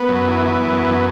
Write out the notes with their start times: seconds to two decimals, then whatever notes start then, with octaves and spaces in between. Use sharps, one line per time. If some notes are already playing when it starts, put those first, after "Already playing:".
Already playing: B3
0.09 F#2
0.28 E3
0.46 E3
0.65 F#2
0.83 F#2